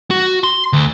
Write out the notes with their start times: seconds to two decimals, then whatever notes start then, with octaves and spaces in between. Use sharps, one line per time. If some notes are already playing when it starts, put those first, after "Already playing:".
0.11 F#4
0.44 C6
0.73 D2